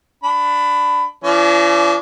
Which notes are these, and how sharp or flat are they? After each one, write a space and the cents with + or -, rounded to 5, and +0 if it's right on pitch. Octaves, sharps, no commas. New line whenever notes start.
D4 +0 B5 +20
F3 -45 D4 -35